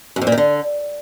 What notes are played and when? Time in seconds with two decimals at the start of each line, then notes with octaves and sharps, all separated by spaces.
0.16 F#2
0.21 F2
0.27 A#2
0.32 D#3
0.38 D3